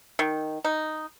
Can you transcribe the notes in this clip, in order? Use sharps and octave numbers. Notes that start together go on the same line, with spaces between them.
D#3
D#4